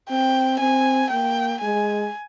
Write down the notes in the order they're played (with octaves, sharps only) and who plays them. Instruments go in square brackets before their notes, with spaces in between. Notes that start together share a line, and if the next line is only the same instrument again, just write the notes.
[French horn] C4 [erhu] G5
[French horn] C4 [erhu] G#5
[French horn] A#3 [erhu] G5
[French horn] G#3 [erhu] G#5